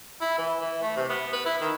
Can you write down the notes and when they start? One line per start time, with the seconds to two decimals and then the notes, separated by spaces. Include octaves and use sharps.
0.21 E4
0.38 E3
0.60 E3
0.82 A3
0.96 C3
1.10 B3
1.33 B4
1.46 E4
1.61 D#3